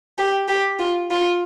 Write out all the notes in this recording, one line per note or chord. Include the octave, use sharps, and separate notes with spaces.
G4
G4
F4
F4